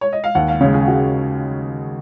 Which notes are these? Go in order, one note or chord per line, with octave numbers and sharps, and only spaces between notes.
C#5
D#5
F5
D#2 F#5
F5
C#3 G#3 C#5
G#4
F#4